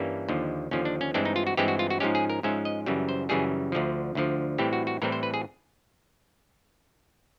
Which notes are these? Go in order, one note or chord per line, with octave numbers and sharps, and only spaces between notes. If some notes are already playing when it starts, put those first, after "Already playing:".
Already playing: G2 E3 G3 A#3 C#4 D4
D#2 D3 F3
D#2 D3 F3 C#4
D4
C#4
G2 E3 G#3 C4 D4
D#4
F4
F#4
G2 E3 G#3 C4 G4
F#4
F4
F#4
G#2 F3 G#3 C#4 G4
G#4
A#4
G#2 F3 G#3 C#4 E5
D#5
F#2 C#3 E3 G3
C5
F#2 C#3 E3 G3 G#4
D2 D3 F3
D2 D3 F3
A2 E3 G3 C4 G4
F#4
F#4
A2 E3 G3 C4 A#4
C5
B4
G#4